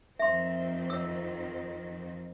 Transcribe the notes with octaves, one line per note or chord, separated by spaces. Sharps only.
F2 D#3 C4 E5 C6
C#5 E6